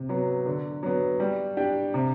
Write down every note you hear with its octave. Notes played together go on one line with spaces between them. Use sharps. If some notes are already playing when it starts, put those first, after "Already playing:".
Already playing: C3
F#3 B3
D3
F#3 B3
G3
D4 G4
C3